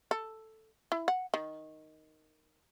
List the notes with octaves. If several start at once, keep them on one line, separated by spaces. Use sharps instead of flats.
A4
E4
F#5
D#3